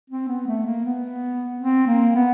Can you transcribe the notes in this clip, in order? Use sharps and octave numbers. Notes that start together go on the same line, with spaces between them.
C4
B3
A3
A#3
B3
C4
A#3
B3